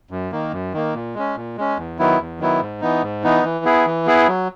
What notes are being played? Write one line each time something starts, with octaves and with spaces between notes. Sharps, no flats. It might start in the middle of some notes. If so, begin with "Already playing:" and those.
F#2
D#3 A#3
F#2
D#3 A#3
A#2
G#3 C#4
A#2
G#3 C#4
E2
D#3 F#3 B3 E4
E2
D#3 F#3 B3 E4
G#2
E3 B3 D#4
G#2
E3 B3 D#4
E3
B3 E4 G#4
E3
B3 E4 G#4
F#3